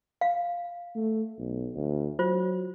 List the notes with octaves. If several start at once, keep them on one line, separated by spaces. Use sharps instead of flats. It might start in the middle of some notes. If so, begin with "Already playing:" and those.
F5
A3
B1
D2
F#3 F4 C5